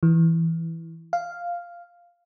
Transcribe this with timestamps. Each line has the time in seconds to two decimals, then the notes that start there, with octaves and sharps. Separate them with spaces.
0.03 E3
1.13 F5